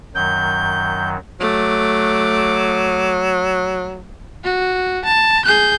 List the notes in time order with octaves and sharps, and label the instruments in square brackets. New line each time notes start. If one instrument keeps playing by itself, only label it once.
[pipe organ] F#2 D#3 F#3 [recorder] G6
[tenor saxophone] F#3 [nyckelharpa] A3 D6
[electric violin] F#4
A5
G#4 G6